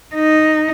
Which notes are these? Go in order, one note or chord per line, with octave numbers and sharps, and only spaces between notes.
D#4